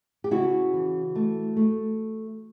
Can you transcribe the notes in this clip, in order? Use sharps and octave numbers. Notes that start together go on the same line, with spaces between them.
G4
C#3 E4 F#4
E3
A3
A3